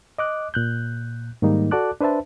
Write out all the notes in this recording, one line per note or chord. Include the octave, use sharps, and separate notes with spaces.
D#5 D6 F#6
A#2 F#6 G6
G#2 D#3 G3 A#3 D#4
F#4 A4 D5 A5 D6 F#6
D4 B4 C5 E5 A5